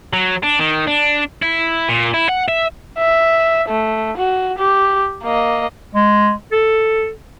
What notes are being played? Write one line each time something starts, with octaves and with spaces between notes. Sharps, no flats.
F#3
D4
D#3
D4
E4
A#2
E4
F#5
E5
E5
A3
F#4
G4
A#3 D#5
G#3
A4